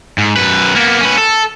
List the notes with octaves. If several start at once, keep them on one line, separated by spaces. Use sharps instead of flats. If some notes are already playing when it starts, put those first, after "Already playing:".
G#2
F#2 B4
A#3 B3
C#4 B4
A4